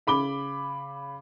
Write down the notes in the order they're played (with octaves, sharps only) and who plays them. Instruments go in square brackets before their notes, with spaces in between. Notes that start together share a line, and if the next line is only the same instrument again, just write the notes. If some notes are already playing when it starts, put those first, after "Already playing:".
[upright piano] C#3 B5 D6 G7